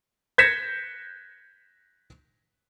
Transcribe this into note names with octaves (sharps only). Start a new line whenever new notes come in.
G6 G#6 A#6 B6 C#7 E7